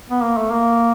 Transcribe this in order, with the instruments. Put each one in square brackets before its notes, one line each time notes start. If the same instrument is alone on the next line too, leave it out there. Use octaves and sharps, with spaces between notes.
[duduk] B3
A#3
A3
A#3